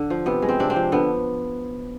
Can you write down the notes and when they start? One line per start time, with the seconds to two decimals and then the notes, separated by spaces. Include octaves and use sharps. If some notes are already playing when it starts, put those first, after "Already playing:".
Already playing: D3
0.10 F3
0.26 C3 B3
0.42 G#3
0.49 C4
0.60 C3 D4
0.70 C4
0.76 F3
0.92 D3 B3